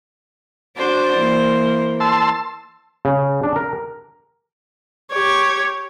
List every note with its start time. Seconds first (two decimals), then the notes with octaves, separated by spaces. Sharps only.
0.77 D4 F#4 C5 D5
1.18 E3 A#3
2.00 A5 C6 E6
3.05 C#3
3.43 D4
3.56 A#4
5.12 G4 C#5